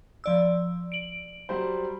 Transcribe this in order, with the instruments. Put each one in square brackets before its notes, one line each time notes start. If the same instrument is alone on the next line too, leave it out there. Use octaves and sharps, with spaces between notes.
[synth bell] F3 D5 E6
D7 F#7
[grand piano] F#3 G3 C5